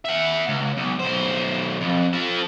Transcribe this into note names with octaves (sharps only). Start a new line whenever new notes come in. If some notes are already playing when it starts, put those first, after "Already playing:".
E5 F#5
C#2
B1
B1 C5
F2
F3 A4